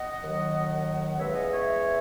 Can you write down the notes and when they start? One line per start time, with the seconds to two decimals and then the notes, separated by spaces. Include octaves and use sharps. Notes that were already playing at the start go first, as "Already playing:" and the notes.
Already playing: D#5 F#5
0.21 D#2 D#3 F#3
1.18 E2 C#3 G#3 C#5 E5
1.30 E5
1.35 D#5 F#5
1.51 C#5 E5